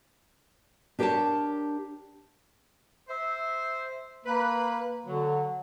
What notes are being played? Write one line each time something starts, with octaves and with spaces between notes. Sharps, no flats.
D4 G4 A#4 B4 C#5 A5
C5 E5
A#3 B4
D3 F#3